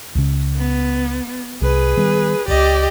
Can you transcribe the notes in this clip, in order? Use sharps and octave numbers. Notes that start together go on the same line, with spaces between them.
C#2 C#3
B3
C2 G#4 B4
D#3 G3 B3
D1 C#2 G4 D5 D#5